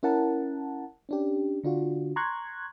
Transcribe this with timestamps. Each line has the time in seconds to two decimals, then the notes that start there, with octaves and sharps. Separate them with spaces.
0.03 C#4 E4 A#4 F#5 A5
1.09 C#4 D4 G4
1.64 D3 D4 F4 F#4
2.16 A#5 C6 C#6 F#6 G#6